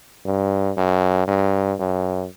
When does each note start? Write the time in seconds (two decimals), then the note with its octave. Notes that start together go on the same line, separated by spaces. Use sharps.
0.26 G2
0.77 F#2
1.28 G2
1.80 F#2